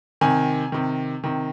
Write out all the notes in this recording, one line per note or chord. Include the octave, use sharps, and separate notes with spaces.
C3 D#3 G#5
C3 D#3
C3 D#3